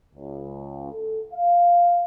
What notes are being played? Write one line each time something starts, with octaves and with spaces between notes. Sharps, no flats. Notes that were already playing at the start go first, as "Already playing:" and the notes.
C#2
A4
F5